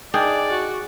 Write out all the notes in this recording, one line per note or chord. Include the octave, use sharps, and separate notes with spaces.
D#3 D4 G#4 D5
F#4